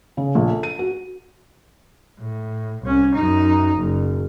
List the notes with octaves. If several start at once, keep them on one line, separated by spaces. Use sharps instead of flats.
C#3
A#1
A4
D#7
F#4
A2
C2 C#4
F#2 D#4
F#1